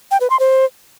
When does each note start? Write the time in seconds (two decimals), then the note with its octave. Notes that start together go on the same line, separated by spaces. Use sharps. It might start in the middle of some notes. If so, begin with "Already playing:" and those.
0.11 G5
0.21 B4
0.30 C6
0.40 C5